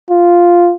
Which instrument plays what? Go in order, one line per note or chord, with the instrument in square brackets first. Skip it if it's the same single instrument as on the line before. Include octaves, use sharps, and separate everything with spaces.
[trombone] F4